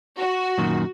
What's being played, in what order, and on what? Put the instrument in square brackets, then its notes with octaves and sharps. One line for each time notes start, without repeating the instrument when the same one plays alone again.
[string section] F#4
[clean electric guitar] F#2 A#2 D#3